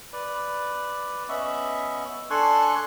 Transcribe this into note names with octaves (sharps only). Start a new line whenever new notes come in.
B4 D5
B3 C#4 D#5 E5 B5 C#6
D4 A4 G#5 C6 C#6 F#6